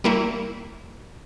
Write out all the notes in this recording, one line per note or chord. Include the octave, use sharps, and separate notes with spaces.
G3 A#3 E4